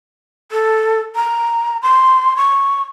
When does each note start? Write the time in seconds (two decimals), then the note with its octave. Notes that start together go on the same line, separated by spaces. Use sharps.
0.52 A4
1.16 A#5
1.83 C6
2.37 C#6